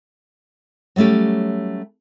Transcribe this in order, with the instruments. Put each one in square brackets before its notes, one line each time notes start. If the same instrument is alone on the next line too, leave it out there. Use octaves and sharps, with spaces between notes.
[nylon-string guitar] F#3 G3 A3 C#4 G4